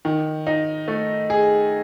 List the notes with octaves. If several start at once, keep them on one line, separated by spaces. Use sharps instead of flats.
D#3
D#4
A3
G#4